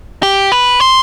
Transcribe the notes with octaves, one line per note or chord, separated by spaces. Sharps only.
G4
B4
C5